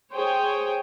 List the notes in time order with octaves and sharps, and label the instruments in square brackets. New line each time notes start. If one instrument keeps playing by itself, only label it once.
[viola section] G#4 C5 C#5 G5